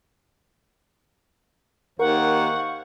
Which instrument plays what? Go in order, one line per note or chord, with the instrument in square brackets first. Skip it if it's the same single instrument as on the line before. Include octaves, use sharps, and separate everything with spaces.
[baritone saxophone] D#2 [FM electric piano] A#4 [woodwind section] C5 F5 C#6 [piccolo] F#5